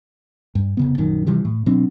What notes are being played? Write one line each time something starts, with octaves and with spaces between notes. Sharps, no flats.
G2
F1 C#3 B3
A#1 F#2 D#3
C3 E3 F3 G3
A2
B2 F#3 C4 D4